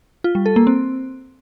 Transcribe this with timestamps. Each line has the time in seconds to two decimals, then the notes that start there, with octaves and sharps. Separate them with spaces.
0.24 F4
0.35 G3
0.46 A4
0.56 A#3
0.67 C4